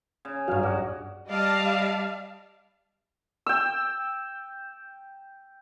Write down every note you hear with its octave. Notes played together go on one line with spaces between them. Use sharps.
C#3
B1 G2 F#4 F5
F#4 D5
G3 D5 D#5 F5 A5
G5 E6